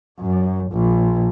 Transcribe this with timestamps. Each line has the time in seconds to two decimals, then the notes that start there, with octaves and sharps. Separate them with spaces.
0.19 F#2
0.72 A#1